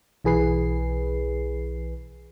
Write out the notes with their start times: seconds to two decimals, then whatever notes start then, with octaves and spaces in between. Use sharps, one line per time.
0.24 B1 E3 G#4 B4 C7